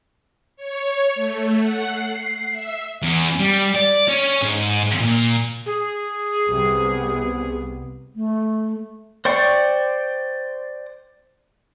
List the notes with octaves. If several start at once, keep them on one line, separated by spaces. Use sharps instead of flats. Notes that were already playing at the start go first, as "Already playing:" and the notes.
C#5
A3
F#5
C7
E5
E2
G3
D5
C#4
G#2
A#2
G#4
C2 C3 B3
A3
C5 D5 G5 C#6